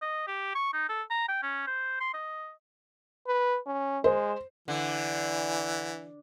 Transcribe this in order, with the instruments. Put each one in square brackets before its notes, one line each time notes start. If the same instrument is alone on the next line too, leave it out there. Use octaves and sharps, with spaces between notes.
[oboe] D#5
G4
C#6
D#4
A4
A#5
G5
C#4
C5
C6
D#5
[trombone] B4
C#4
[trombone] G#3 [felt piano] C5
[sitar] D3 [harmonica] E3